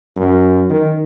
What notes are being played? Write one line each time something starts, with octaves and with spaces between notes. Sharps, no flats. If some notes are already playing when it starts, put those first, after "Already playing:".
F#2
D#3